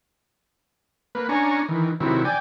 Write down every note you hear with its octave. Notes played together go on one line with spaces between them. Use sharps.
A#3 B4
C#4 D4 G#5 A#5 C#6
D#3 E3
C3 D#3 F#3 E4
D5 G5 G#5